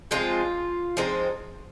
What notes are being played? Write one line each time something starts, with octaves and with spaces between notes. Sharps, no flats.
F3 G#3 C4 D#4 F4
F3 G#3 C4 D#4